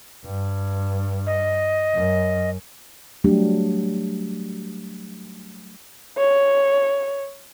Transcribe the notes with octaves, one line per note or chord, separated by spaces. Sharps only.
G2
D#5
F#2
F#3 G3 A3 D4 G4
C#5